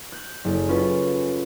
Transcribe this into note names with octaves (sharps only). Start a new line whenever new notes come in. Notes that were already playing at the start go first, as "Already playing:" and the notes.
F#6 G6
F#1 A4 F6
C#4 F4 B4 A5